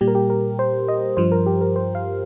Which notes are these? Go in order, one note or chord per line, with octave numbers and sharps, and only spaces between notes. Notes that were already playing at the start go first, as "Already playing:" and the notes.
A#2 G3 G4
A#4
G4
A#4
C5
D#5
G2 F3 C5
A#4
G4
A#4
C5
F5